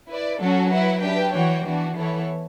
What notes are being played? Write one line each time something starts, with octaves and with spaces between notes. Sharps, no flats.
E4 B4 D5
F#3 C#4 F#4 A4
E4 B4 F#5
D4 G4 B4 E5 G5
E3 F#4 C#5 G5
E3 B3 D4 F#4
E3 B3 E4 A4 C#5